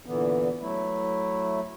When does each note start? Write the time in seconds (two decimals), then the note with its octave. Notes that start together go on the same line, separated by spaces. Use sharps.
0.06 A#2 D3 E3 B3
0.61 F#3 A3 E4